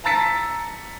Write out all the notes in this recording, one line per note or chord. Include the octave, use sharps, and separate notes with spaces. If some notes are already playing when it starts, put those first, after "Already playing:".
A5 A#5 E6 A6 B6 C#7